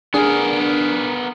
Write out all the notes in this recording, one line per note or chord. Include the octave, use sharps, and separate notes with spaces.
B3 D4 G#4 A#4